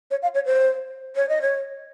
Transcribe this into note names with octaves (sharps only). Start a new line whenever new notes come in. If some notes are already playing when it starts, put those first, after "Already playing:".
C#5
F5
C#5
C5
C#5
D#5
C#5